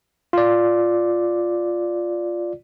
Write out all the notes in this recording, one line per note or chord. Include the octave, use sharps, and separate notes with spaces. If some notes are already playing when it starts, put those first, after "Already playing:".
F4 D5